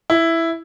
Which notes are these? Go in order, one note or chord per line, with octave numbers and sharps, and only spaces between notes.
E4